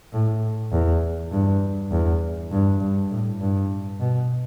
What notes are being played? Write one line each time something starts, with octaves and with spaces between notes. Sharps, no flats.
A2
E2
G2
E2
G2
G2
A2
G2
B2